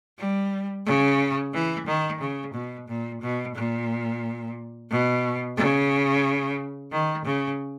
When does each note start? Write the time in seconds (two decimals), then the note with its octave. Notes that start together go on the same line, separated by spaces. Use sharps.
0.18 G3
0.86 C#3
1.54 E3
1.86 D#3
2.20 C#3
2.54 B2
2.88 A#2
3.22 B2
3.55 A#2
4.90 B2
5.57 C#3
6.91 D#3
7.25 C#3